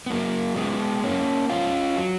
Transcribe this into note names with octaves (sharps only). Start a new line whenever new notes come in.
B3
F#2 F#3 A#3
C#3 F3 G#3 B3
F#2 A#3 C#4
C#3 F3 C#4 F4
F#3